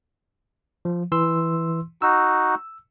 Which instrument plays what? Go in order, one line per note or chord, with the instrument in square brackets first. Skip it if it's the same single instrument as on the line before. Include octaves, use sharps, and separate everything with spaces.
[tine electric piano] F3
E3 C6 E6
[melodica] D#4 F#4 [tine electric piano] E6